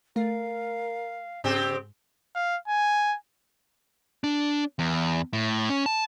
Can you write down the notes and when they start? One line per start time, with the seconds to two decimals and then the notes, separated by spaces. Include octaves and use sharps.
0.16 A3 A#4 F5
1.44 G#2 C#3 C4 G4
2.35 F5
2.68 G#5
4.24 D4
4.79 E2
5.33 A2
5.70 C#4
5.86 A5